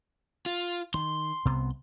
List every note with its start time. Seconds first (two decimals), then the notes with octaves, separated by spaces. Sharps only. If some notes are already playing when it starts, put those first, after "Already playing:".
0.46 F4
0.94 D#3 C6
1.45 C2 C3 B3